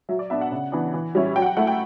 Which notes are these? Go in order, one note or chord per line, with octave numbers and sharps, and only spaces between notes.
F#3 E5
D5
B3 D4 E5
F#5
C#3
E3 B3 D4
E3
G3 C#4 E4
F#3 G5
F#5
G5
A3 E4 F#5
G5